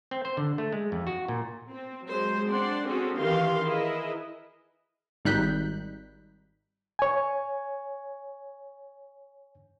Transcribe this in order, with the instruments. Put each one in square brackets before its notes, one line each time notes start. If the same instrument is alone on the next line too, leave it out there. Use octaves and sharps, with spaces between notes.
[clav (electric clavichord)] C4
C5
D3
A3
G#3
F2
F#4
A#2
[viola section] C4
F#3 G#3 C5
C4 D4 D5 F#5 C6
C4 C#4 F#4 G#4 A4
D#3 E3 C#4 G4 F5 C6
E4 G#4 A#4 B4 D#5
[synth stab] G#1 G3 D#4 F#6 G6 B6
[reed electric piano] C#5 G#5